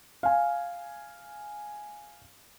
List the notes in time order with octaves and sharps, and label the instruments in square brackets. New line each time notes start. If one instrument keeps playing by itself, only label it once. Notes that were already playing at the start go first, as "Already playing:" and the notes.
[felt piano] F5 G#5